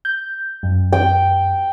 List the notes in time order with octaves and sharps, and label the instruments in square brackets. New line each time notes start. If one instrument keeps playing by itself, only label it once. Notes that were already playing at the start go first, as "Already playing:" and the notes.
[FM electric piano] G6
F#2
[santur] G5